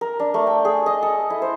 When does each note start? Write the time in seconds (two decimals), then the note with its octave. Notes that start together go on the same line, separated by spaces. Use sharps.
0.01 A#4
0.20 D4
0.34 A3
0.47 G5
0.65 G#4
0.86 D#5
1.03 A4
1.30 E4
1.42 C5